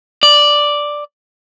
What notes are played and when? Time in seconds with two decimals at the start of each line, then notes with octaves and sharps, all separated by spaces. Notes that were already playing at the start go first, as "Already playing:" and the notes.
0.23 D5